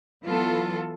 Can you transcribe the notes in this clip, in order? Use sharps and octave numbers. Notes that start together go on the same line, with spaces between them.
E3 F#3 B3 F4 A4